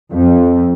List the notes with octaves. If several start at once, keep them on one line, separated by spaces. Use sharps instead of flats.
F2